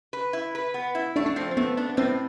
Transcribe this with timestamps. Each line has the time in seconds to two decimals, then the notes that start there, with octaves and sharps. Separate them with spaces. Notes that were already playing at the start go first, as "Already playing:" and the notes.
0.13 B4
0.33 E4
0.55 B4
0.74 B3
0.95 E4
1.16 A3 D4
1.26 D4
1.36 F3 C4
1.51 C4
1.57 A3 B3
1.77 B3 D4
1.90 B3
1.97 A2 C4